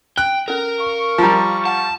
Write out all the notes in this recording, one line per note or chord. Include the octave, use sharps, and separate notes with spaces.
G5 F#6
C#4 A4 A#4
F5 C#6
F3 G3 F4 A#5
F#5 A5